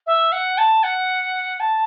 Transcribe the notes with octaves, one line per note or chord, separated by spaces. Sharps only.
E5
F#5
A5
F#5
A5